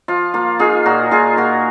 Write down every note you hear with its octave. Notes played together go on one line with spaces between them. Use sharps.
F3 F4
A#3 F4
D#4 F4 G#4
A#2 F#4 A#4
A#2 F4 G#4
A#2 F#4 A#4